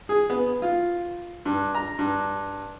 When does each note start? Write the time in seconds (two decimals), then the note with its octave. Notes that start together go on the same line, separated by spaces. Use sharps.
0.09 G#4
0.30 B3
0.62 F4
1.46 G2
1.75 A#5
1.99 G2